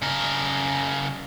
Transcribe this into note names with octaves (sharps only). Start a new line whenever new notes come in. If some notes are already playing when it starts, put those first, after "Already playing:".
C#3 A#4